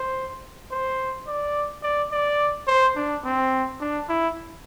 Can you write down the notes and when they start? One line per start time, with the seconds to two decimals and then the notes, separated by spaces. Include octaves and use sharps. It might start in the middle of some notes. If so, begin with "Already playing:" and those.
Already playing: C5
0.71 C5
1.27 D5
1.83 D5
2.12 D5
2.67 C5
2.96 D4
3.24 C4
3.81 D4
4.09 E4